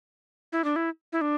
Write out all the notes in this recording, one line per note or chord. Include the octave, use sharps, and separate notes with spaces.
E4
D4
E4
E4
D4